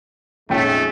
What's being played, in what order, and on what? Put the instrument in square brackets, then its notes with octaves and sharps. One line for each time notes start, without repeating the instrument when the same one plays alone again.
[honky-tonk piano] A#1 C#4 G5 [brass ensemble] F2 G#3 D#4 [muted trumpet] A3